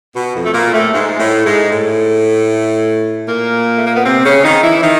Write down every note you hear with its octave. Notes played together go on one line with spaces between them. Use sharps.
B2
F2 F3
A3
A#2 A#3
A2 A3
G#2 G#3
A2 A3
G#2 G#3
A2 A3
A#2 A#3
A3
A#3
B3
C3 C4
C#3 C#4
D#3 D#4
E3 E4
D#3 D#4